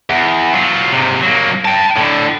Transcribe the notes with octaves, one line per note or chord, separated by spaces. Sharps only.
E2
F#3 F4
G#2 C3
F#3 A#3
G5 A5
A2 D3